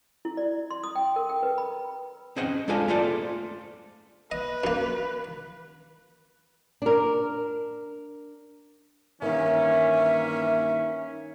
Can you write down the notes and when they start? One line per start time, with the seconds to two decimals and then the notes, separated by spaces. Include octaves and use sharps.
0.25 E4
0.37 D5
0.71 C6
0.84 D#6
0.95 G5
1.16 A#4
1.29 G5
1.43 B4
1.58 B5
2.36 C4 C#4 G#4 C5 D#5 F#5
2.68 G#3 D4 F4 A4 F5 G#5
2.88 A3 A#3 F4 A4 C5 D5
4.32 B4 D#5
4.64 F#2 A#3
6.82 D4 A#4
9.22 G2 D#3 E3 A#3 C#4 E5